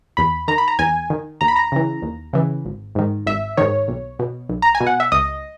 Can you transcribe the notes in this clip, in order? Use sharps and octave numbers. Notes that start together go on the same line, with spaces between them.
E2 B5
D#3 A#5
B5
A#5
E2 G#5
D#3
D#2 A#5
B5
A#5
C#3 E3
D#2
C#3 E3
G#1
G#2 D#3
G#1 E5
G#2 D#3 C#5
B1
B2
B1
A#5
G#5
B2
F#5
E5
C#2 D#5